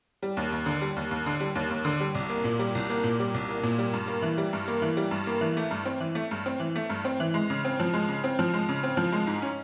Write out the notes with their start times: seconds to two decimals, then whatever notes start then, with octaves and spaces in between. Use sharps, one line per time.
0.22 G3
0.37 D#2
0.52 D#2
0.66 D3
0.81 G3
0.96 D#2
1.11 D#2
1.26 D3
1.40 G3
1.55 D#2
1.70 D#2
1.85 D3
2.00 G3
2.15 C2
2.29 A#3
2.44 A#2
2.59 G3
2.75 C2
2.90 A#3
3.04 A#2
3.19 G3
3.34 C2
3.49 A#3
3.63 A#2
3.78 G3
3.94 G2
4.08 A#3
4.22 E3
4.38 G3
4.53 G2
4.68 A#3
4.82 E3
4.97 G3
5.11 G2
5.27 A#3
5.41 E3
5.57 A3
5.71 G2
5.85 C4
6.00 E3
6.15 A3
6.31 G2
6.46 C4
6.60 E3
6.76 A3
6.90 G2
7.05 C4
7.20 E3
7.34 G#3
7.50 C#3
7.65 C4
7.80 F3
7.93 G#3
8.09 C#3
8.24 C4
8.39 F3
8.54 G#3
8.69 C#3
8.83 C4
8.97 F3
9.12 G#3
9.27 G#2
9.42 C#4